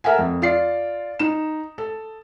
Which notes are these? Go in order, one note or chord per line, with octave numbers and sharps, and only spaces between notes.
A4 A#4 E5 F#5 G#5
F2
F4 D5 C7
D#4 E7
A4